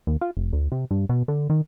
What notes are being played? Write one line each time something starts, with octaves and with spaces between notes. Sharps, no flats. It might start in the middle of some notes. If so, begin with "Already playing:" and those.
D#2
F4
F1
D2
C3
G2
B2
D3
D#3